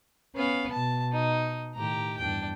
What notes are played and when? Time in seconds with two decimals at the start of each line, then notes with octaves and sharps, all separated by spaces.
0.35 B3 C#4 F5
0.72 B2 A5
1.12 D#4
1.75 A2 D#3 G4 A#5
2.18 E2 G2 D4 G5